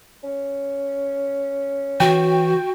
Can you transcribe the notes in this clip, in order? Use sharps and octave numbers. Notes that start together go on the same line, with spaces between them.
C#4
E3 F#4 G5